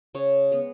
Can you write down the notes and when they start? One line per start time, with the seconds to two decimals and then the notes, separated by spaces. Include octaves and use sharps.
0.15 C#3 C#5
0.51 G#3 B3